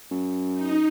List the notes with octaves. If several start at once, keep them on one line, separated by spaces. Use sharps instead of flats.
F#2
D#4